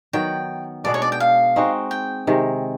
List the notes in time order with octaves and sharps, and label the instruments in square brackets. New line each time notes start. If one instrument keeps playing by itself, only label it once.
[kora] D#3 F#3 B3 [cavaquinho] G5
[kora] B2 G#3 B3 D4 [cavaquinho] D5
[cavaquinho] C#5
D5
G5
F5
[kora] G#3 C4 D#4 F#4
[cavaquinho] G5
[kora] C3 D#3 G#3